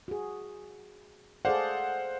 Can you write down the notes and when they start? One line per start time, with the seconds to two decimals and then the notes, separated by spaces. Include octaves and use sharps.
0.08 F#4 G#4
1.45 G#4 A4 C5 D5 F5 F#5